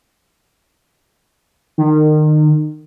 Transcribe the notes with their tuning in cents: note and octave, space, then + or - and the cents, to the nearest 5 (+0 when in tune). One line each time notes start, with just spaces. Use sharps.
D#3 -30